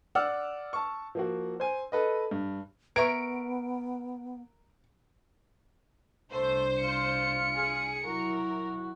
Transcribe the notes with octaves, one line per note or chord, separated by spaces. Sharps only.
D5 F#5 D6 E6 F6
A5 C#6
F3 A#3 F#4
C5 G#5
A4 B4 D#5
G2
B3 A#4 B4 E5 C#6 D7
C2 A3 D4 C5
F4 C#7
G#4
F#3 E4 F#4 A#4